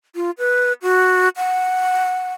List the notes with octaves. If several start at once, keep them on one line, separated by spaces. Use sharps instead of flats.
F4
B4
F#4
F#5